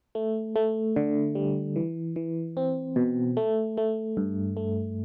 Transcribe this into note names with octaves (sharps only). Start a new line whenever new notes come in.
A3
A3
D3
G3
E3
E3
C4
B2
A3
A3
G2
A3